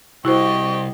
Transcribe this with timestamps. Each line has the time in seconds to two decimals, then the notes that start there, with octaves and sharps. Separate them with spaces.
0.25 C2 E4 F#4 G4 C5 D#5 C#6